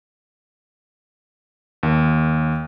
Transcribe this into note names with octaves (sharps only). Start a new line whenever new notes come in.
D#2